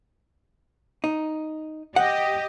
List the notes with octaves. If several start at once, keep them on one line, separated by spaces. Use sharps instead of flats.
D#4
G4 D#5 F#5